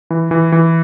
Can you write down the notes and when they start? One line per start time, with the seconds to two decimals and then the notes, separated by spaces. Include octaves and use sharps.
0.10 E3
0.31 E3
0.52 E3